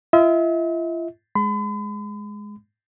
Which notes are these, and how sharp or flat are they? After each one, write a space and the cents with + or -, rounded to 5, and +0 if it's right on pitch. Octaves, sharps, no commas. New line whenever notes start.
F4 -45 E5 -45
G#3 +0 B5 +45